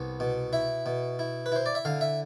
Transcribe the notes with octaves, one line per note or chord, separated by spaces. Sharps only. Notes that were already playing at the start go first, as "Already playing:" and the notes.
Already playing: C2 B3
B2
E4 E5
B2
E4
B4
E4 C5
D5
E5
D3 F5
E5